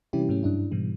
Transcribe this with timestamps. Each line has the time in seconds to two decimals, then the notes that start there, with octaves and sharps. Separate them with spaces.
0.13 C3 E3 G3 C#4 E4 G4
0.29 G#2 F#3 A3 C#4
0.43 G2 D4 E4
0.72 G#2 B2 E3 G3